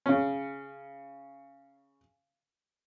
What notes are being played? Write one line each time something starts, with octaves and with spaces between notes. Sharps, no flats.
C#3 C#4